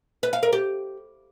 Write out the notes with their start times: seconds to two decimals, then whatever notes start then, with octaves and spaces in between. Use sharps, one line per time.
0.23 B4
0.33 F5
0.43 A#4
0.53 G4